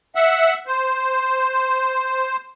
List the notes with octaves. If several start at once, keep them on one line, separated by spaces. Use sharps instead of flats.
E5 F#5
C5